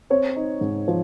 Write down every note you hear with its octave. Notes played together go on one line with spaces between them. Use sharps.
C4 C#5
D#4
G#2
F3